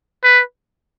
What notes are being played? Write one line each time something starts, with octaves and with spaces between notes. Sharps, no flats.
B4